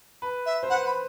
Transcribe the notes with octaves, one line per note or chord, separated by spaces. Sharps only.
B4
E5
C5
B4 F#5
B5